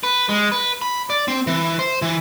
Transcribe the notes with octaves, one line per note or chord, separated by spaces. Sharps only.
B4
G#3
B4
B5
D5
C4
E3
C5
E3